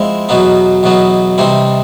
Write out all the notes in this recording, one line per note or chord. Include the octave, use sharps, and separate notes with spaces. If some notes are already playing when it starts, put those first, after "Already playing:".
Already playing: F3 G#3 C4 E4
E2 B2 F#3 B3 D#4
E2 B2 F#3 B3 D#4
C3 E3 G3 C4 D#4